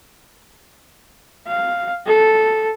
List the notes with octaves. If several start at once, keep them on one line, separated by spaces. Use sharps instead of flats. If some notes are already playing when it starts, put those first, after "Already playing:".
F5
A4